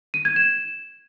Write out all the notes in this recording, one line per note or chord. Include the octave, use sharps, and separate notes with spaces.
D#7
G#6
E7